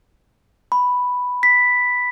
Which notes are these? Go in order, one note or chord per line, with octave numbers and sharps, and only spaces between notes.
B5
B6